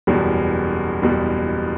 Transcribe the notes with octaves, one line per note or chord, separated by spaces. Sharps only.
F#1 E2 B2 G3
F#1 E2 B2 G3